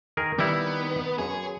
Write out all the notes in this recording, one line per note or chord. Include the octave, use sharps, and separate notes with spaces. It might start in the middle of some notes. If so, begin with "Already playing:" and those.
D#3 G#4 A#4
D#3 G3 B3 E4 A#5
F#2 G#4 C#5